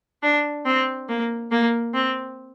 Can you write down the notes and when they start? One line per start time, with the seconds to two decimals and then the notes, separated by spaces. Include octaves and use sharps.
0.22 D4
0.65 C4
1.08 A#3
1.51 A#3
1.94 C4